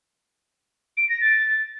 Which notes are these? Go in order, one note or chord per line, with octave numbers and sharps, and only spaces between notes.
D7
A#6
A6